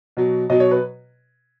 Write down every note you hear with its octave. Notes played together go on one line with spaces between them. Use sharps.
B2 F#3
B2 F#3 D#5
C#5
B4